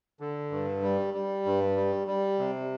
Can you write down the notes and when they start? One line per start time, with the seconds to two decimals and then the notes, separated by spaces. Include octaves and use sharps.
0.20 D3
0.51 G2
0.82 G3
1.14 G3
1.46 G2
1.77 G3
2.07 G3
2.39 C3